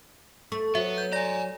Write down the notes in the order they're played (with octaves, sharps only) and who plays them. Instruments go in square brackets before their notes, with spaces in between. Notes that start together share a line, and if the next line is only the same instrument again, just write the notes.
[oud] A3 [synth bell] C#6
[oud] F#3 [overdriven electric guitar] B3 [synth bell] E5
[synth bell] G6
[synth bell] D5 A#6 [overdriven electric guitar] G#5 A#5